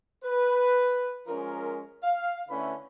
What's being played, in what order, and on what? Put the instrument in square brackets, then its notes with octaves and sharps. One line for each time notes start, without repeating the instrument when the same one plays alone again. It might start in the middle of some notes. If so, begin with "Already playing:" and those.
[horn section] B4
F3 G#3 C#4 A#4
F5
D3 A3 C#4 E4 B4 B5